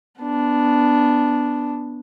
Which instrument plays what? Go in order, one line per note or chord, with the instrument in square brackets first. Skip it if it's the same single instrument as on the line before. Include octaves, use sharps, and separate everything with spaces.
[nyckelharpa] B3 D4